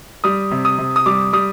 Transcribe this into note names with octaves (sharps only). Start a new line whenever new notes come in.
G3 D#6
C3
D#6
C3
D#6
G3 D6
G3 D#6